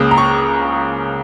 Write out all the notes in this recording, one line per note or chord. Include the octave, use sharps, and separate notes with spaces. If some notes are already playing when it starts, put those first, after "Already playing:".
Already playing: C#2 C#3 A#3 D#6
A#5
C#6